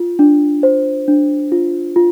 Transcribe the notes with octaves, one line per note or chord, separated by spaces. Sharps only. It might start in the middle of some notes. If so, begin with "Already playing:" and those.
Already playing: F4
D4
C5
D4
F4
F4